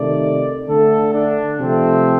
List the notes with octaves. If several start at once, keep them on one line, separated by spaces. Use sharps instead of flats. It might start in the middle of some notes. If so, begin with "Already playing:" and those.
Already playing: C3 D#3 A3 D5
D3 A3 A4
D4
C3 F3 A3 C4